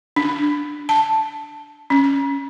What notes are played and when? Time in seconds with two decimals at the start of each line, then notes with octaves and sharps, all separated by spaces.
0.16 D4
0.89 A5
1.90 C#4